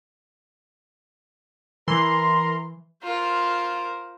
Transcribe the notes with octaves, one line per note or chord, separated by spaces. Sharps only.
E3 A#4 C6
F4 A#4 C5